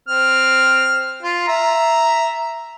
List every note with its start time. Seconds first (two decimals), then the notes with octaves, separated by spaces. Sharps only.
0.08 C4 F6
1.23 F4
1.48 E5 A#5